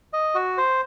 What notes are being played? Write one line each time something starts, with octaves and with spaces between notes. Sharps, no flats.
D#5
F#4
C5